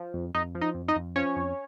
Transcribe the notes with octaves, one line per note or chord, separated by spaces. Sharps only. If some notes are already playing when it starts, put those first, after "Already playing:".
Already playing: F3
F2
F2 D#4 D#5
F3
D#4 D#5
F2
D#4 D#5
F2
F3 C#4 C#5
F2